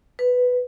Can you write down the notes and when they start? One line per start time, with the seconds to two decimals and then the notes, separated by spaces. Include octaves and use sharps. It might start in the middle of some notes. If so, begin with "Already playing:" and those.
0.19 B4